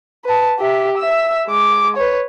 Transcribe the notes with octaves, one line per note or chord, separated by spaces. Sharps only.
B4 A5
G4 E5
E5 E6
G#3 D6
B4 C#5